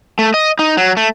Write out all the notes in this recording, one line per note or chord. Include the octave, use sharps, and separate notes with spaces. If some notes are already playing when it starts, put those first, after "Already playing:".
A3
D#5
D#4
F#3
A3